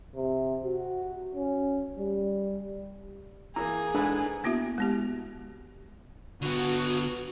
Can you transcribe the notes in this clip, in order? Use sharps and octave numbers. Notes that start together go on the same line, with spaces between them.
C3
F#4
C#4
G3
E3 A#3 G#4 A#5
G#2 D4 A4 B4 G#5
A#3 B3 E4 F#4 E5
G#3 B3 G4
D3 B3 F#4